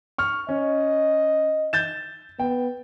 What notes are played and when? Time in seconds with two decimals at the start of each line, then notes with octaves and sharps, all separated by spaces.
0.18 C#6 F6
0.49 C#4 D#5
1.73 G6 A6 E7
2.39 B3 G5